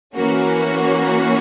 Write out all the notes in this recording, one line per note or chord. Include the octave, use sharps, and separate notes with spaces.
E3 A#3 C#4 F#4